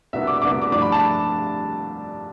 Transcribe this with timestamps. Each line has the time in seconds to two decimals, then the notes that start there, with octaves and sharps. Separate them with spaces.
0.13 C2 B2 B3 D4 E5
0.27 D6
0.42 C2 B2 B3 D4 D6
0.62 D6
0.72 G2 F3 A3 D4 D6
0.82 B5
0.92 A5